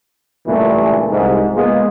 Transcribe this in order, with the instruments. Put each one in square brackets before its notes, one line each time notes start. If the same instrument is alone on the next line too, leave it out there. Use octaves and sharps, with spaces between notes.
[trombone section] C#2 G2 A#2 E3 A3
C2 G#2
G#3 A#3 B3 F4 G#4